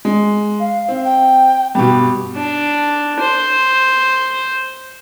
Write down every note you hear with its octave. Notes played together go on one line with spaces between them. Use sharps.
G#3
F5
C4
G5
G2 B2 G4
D4
C5